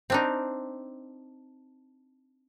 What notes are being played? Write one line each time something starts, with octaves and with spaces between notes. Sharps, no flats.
C4 D4 D#4